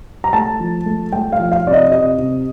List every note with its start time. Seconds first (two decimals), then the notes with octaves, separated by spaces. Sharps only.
0.24 A#5
0.33 A3 A5
0.59 F3
0.86 A3
1.12 A3 G5
1.33 F5
1.39 F3
1.52 F5
1.66 C3 D5
1.73 D#5
1.92 C3 D#5
2.18 C3